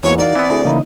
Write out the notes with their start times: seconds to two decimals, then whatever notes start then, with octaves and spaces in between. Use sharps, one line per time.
0.03 E2 G#2 E3 A#3 F#4 C#5
0.18 E3 D#4 F#4 A#4 D5 F5
0.35 E3 B3 C4 E5
0.50 D2 E4 G#4
0.65 C#3 E3 A#3 D#4 E4 D#5